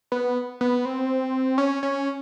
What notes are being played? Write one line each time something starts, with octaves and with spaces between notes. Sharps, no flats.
B3
B3
C4
C#4
C#4